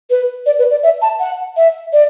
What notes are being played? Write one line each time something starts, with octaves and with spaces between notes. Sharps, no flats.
B4
D5
B4
D5
E5
A5
F#5
E5
D5